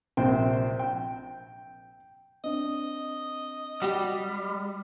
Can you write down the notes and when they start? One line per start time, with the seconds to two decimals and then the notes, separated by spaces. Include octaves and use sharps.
0.17 A#1 C3 C5 G5
0.79 G5
2.44 C4 D4 D#5
3.82 G3 F#4 G4